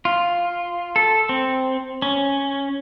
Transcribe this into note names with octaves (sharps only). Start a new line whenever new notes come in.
F4
A4
C4
C#4